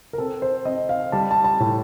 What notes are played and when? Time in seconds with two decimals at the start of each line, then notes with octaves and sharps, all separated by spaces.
0.13 A#4
0.18 C4 A4
0.42 C5
0.65 C4 D#5
0.89 F5
1.12 G3 A5
1.31 A5
1.44 A5
1.60 A2